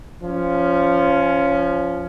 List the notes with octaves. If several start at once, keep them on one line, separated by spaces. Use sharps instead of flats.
F3 C#4